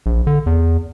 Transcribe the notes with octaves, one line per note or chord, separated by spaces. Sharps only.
A#1
D3
E2